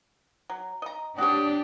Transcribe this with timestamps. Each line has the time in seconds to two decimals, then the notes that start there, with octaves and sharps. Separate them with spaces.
0.50 F#3
0.82 D#5 A#5
1.18 D4 F#4 G4 C#5 D#6